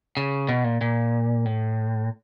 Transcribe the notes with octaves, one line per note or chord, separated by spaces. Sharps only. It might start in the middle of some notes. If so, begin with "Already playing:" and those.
C#3
B2
A#2
A#2
A2